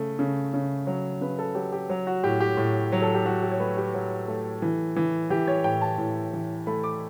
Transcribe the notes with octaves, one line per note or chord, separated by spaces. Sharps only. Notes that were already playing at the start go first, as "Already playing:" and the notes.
Already playing: C#3 A3
C#3
C#3
F#3
C#3 B4
A4
F#3 G4
G4
F#3
F#4
A2 G4
G4
A2
F#3
A4
G4
F#3 F#4
G4
C#5
A3 B4
G4
F#3
A3
E3
E3
E3 G4
C#5
A2 G5
A5
A2
E3
A3 B5
D6